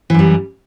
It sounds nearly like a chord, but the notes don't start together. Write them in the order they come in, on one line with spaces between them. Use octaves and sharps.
E3 F#2 G3